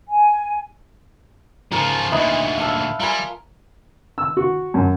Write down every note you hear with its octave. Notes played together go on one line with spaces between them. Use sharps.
G#5
C#3 F3 A#4 G#5 C#6
D2 A#2 D#4 B4 D#5 E5
F5 A5 E6
G3 F4 A#4 G#5
E6
F#4
F#2